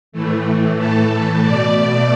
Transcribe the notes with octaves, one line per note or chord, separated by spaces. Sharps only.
A2 E3 A3
A4
B2 A3 D5